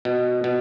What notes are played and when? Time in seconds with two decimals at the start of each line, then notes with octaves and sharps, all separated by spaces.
0.05 B2
0.44 B2